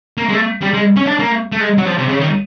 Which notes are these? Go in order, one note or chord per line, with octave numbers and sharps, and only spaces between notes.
A#3
G#3
A3
G3
G#3
C#4
D4
A#3
A3
G#3
F#3
F3
C3
C#3
D#3